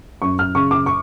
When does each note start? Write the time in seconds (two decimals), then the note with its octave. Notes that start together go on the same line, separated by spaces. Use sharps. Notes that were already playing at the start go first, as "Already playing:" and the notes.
0.22 F#2 C#6
0.39 F6
0.55 C#3 C#6
0.71 D6
0.86 C#6